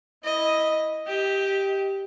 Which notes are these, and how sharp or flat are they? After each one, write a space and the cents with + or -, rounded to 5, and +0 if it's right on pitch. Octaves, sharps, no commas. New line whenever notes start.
E4 -10 D#5 +0
G4 +0 D#5 +25